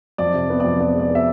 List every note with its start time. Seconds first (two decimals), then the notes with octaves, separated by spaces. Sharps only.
0.18 F2 D5
0.34 C3
0.50 B3
0.60 F2 D5
0.80 B3 D5
0.94 G#3
1.00 D5
1.10 B3
1.15 E5